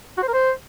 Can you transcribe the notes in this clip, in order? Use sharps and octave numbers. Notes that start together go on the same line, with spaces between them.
F#4
C5
A#4
C5